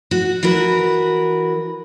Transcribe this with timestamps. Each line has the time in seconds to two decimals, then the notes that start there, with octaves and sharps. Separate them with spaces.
0.11 F#4
0.43 E3 F#4 A#4 B4